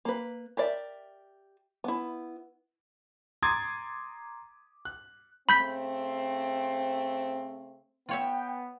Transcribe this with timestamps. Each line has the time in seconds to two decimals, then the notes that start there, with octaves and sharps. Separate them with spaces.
0.05 A#3 B4
0.57 G4 A#4 D5 E5
1.84 B3 E4
3.42 A#5 C6 D6 D#6 G#6 A6
4.85 F#6
5.49 C#3 A3 C4 B5 G6 B6
8.09 B3 F4 C#5 E5 G5